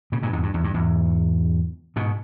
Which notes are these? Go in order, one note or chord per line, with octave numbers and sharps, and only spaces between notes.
A#2 C#3
G2 A#2
E2 G#2
G2
E2
G2
E2 G#2
G#2 B2